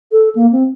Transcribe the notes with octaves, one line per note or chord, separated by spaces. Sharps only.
A4
A#3
C4